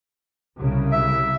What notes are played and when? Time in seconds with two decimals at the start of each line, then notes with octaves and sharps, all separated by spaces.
0.57 C2 C#3
0.92 E5